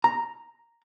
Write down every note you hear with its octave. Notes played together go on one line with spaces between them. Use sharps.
A#5